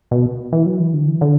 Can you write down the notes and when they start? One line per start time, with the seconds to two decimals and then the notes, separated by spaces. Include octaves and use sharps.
0.11 B2
0.53 E3
0.66 F#3
0.80 E3
0.94 D3
1.08 E3
1.21 D3